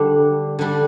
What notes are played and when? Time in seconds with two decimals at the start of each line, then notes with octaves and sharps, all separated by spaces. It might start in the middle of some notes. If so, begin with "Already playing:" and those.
Already playing: D3 G3 D4
0.59 D3 G3 D4